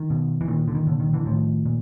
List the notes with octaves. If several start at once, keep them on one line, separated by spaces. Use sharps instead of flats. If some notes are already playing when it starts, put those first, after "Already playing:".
Already playing: D#3
B2
E3
A#2 D#3
D3
D#3
A#2 D3
D#3
D3 E3
A2 D#3 F3
A#2